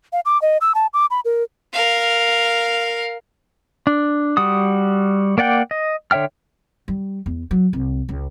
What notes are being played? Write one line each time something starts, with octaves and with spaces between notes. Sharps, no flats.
F5
D6
D#5
E6
A5
D6
B5
A#4
A#4 F5
D4
G3 F#4 D#6
A#3 D5 F#5 G5
D#5
D3 C#5 E5 G5 F6
G3
E2
F#3
C2
C#2